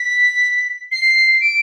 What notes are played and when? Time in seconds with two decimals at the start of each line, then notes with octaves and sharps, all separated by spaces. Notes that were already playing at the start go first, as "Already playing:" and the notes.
Already playing: B6
0.91 C7
1.41 D7